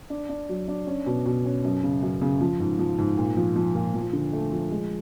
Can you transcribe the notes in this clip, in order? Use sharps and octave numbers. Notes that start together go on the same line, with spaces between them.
D4
D4
F#3
D4
C#4
B2
B2
C#4
F#2
C#3
F#2
C#3
F3
G#2
F3
G#2
A#2
F3
F3
A#2
F3
D3
A3
F3
G#3